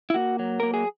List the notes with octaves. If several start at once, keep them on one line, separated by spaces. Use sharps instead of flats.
E4
A#3 F#4
F#3
A#3 A#4
G#4